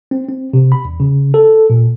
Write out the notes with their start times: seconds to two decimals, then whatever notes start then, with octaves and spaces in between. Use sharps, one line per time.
0.11 C4
0.29 C4
0.53 C3
0.72 B5
0.85 E2
1.00 C#3
1.34 A4
1.70 A#2